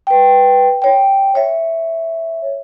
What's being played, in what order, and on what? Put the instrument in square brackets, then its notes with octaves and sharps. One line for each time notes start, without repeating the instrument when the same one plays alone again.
[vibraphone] B4 G5
C#5 G5
C#5 E5